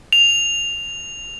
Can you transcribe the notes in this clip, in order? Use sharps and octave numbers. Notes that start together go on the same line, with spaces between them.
F7